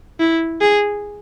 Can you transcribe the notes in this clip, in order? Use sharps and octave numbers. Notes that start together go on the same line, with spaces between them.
E4
G#4